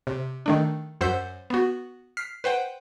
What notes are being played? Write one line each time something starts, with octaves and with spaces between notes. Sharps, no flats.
C3
D#3 A3 D4
F#2 C5 F#5 E6 G6 B6
B3 F#4
F6 B6 C7
B4 C5 F#5 G5